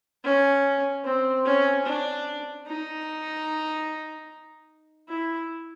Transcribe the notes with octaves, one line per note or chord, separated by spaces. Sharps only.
C#4
C4
C#4
D4
D#4
E4